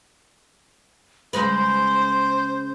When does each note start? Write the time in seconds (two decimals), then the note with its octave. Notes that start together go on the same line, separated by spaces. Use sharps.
1.33 C#3 G#3 B4 C5